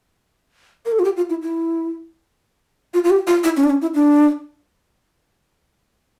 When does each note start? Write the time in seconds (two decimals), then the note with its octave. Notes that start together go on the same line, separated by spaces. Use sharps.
0.86 A#4
0.92 A4
0.99 F4
1.05 G4
1.16 F4
1.30 E4
1.42 E4
2.94 F4
3.04 F4
3.10 G4
3.27 F4
3.44 E4
3.57 C#4
3.64 D4
3.70 C#4
3.82 E4
3.95 D4